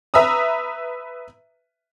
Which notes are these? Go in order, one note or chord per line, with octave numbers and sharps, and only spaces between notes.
B4 E5 A#5 D#6